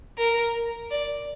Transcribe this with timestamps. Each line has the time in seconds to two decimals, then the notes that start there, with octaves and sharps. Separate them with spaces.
0.18 A#4
0.91 D5